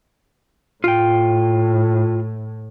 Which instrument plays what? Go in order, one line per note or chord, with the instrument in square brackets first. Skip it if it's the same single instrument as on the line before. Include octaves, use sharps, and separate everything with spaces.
[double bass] A2 [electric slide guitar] F4 G5